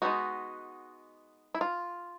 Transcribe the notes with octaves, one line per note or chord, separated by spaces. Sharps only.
G#3 B3 D#4 F#4
E4
F4